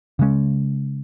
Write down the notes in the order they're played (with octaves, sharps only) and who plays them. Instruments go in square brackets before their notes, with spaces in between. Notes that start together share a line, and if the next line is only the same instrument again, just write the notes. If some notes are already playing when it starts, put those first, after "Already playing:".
[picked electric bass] C#3 G#3 C#4